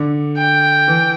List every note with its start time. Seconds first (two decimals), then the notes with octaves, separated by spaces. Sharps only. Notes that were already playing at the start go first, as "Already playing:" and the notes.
Already playing: D3
0.38 G5
0.88 E3